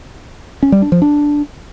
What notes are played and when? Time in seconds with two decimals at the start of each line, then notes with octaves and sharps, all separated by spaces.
0.63 C#4
0.72 G3
0.82 D4
0.92 F3
1.02 D4